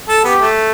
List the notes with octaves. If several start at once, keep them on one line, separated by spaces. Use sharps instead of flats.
A4
B3 G4
A3